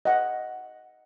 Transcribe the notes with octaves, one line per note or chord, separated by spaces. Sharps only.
D#5 F#5